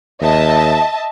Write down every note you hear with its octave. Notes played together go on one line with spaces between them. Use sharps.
D#2 D#5 E5 A5